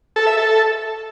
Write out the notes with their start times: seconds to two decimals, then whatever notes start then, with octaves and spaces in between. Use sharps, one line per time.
0.16 A4
0.27 E5
0.37 A4